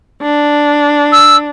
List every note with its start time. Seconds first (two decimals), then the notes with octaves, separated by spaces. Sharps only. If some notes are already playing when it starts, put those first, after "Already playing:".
0.22 D4
1.12 E6